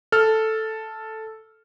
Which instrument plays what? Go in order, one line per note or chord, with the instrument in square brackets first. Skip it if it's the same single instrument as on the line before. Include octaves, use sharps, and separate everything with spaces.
[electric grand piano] A4 F6